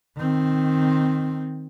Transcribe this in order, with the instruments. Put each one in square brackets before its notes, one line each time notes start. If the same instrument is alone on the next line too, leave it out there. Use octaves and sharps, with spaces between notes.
[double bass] D#3 C4